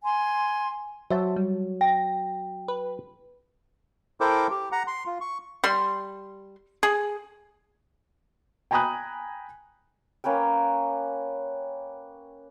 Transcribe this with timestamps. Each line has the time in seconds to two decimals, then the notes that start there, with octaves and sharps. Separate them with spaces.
0.04 G#5 C6
1.10 F#3 C5 E5 A5
1.36 G3
1.81 G5 A#6
2.68 B4
4.20 E4 A4 A#4 C5 G5 D6
4.50 G4
4.72 F#5 A#5
4.87 C6
5.06 F4
5.21 C#6
5.64 G3 C6
6.83 G#4
8.71 G5 G#5 A#5 B5 D#6 F#6
10.24 A#3 C#4 B4 G5